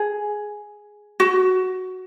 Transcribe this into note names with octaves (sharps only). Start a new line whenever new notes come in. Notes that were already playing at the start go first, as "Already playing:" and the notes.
Already playing: G#4
F#4